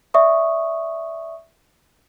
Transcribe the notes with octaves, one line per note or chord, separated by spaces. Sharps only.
D5 E5 C#6 D#6